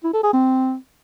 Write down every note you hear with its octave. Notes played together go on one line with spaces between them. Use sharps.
E4
A4
G#4
C4